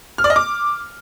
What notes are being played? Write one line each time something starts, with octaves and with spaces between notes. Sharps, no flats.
F6
D5
D#5
D6